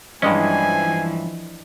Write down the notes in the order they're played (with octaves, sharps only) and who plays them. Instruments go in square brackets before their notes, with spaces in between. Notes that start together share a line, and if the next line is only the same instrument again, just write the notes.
[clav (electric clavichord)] G2 G#3 C#4 [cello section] E3 F3 [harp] D4 D#5 [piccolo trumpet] G#5